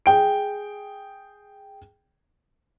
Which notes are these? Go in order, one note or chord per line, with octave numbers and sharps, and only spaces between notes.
G#4 G5 D7